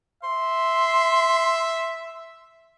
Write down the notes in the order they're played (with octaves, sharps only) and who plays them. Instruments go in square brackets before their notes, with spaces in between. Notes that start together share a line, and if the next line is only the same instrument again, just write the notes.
[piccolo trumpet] E5 [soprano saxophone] C6